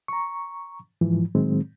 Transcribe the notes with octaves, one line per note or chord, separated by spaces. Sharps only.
A#5 C#6
G#2 E3 F3
A2 D#3 F#3 G#3 C4